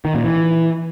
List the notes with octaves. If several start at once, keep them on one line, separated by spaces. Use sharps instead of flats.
D#3
A#2
E3